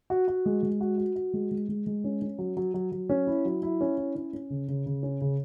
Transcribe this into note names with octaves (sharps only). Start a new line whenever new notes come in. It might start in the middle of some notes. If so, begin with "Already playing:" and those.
F#4
F#4
G#3
G#3
F#4
F#4
F#4
G#3
G#3
G#3
G#3
C#4
C#4
F#3
F#3
F#3
F#3
C#4
E4
F#3
E4
C#4
E4
C#4
C#4
C#3
C#3
C#3
C#4
C#3